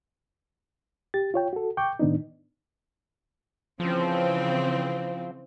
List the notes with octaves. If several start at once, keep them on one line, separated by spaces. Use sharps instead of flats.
G4 A6
F4 C#5 G5
F#4 A4
G5 C#6 D6 G6
A2 D#3 B3 D4 D#4
C#3 E3 F3 C4